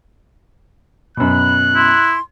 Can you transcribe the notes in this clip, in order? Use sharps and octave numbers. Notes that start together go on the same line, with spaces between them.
F#2 B2 B5 F#6
E4 C6